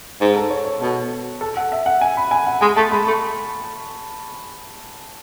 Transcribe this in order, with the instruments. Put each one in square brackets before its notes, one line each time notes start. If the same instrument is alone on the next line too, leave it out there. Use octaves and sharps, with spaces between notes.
[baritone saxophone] G#2
[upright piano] A4
C#5
C#5
[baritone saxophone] B2 [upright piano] A4
[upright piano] A4
F#5
E5
F#5
G#5
B5
G#5
F#5
[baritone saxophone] G#3 [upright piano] G#5
[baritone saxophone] A3 [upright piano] A5
[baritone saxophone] G#3 [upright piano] B5
[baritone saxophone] A3 [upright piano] C#6